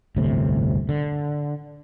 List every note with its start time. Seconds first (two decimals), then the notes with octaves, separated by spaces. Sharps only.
0.16 G1 D2 A2 C3
0.89 D3